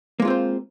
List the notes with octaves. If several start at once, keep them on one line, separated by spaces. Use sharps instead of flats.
G#3 A#3 C4 F4 C5